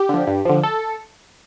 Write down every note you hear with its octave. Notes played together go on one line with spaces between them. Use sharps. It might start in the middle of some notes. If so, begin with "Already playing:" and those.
Already playing: G4
D3 F3
G2
D3 F3
A4